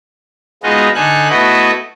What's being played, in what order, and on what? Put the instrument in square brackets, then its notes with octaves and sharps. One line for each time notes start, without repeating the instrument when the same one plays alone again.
[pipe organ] G#3 B3 D#4 F4 F#4 D#5
D3 D#4 A4 G#5 F#6
A3 B3 E4 F#4 B4 D#5